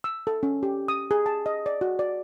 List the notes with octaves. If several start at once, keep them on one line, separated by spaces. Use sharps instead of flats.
E6
A4
C#4
G4
D#6
G#4
A5
D#5
D5
F#4
D5